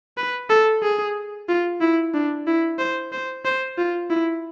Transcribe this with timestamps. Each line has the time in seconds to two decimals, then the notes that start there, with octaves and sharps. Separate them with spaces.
0.17 B4
0.50 A4
0.82 G#4
1.48 F4
1.81 E4
2.14 D4
2.46 E4
2.79 C5
3.12 C5
3.45 C5
3.78 F4
4.10 E4